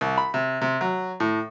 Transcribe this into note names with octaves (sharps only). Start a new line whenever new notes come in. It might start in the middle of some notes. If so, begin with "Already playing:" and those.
C2
B5
C3
C3
F#3
A2